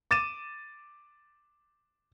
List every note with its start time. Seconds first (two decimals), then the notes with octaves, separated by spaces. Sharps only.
0.11 D6 A6 D#7 E7